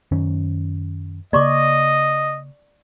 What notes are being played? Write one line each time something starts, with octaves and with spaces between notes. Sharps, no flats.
F#2 D#3 C#4
C#3 A#3 D5 D#5 C#6 D6